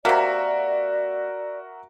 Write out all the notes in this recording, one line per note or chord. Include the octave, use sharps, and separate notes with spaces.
C3 A#3 F#4 A#4 D5 E5